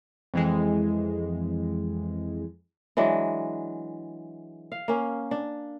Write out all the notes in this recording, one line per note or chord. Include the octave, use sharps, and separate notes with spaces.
F2 E3 G#3
E3 F#3 G#3 D4
F5
A#3 C#4
D4